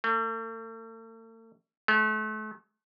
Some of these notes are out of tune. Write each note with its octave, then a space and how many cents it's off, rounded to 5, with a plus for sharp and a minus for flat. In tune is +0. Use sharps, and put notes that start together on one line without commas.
A3 +45
A3 -35